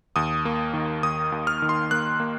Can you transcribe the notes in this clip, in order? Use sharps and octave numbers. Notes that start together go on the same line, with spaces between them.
D#2 D#6
A#3
D#3
D#2 D#6
D#2
F6
D#3
C6
A#3 F#6
A#3